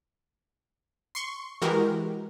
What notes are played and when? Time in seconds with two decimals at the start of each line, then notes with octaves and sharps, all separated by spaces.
1.15 C6 C#6
1.62 E3 G#3 F#4 G4 A#4